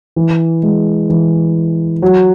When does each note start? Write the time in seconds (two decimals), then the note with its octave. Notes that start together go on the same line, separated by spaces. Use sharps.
0.16 E3
0.63 G#3
1.10 E3
2.02 F#3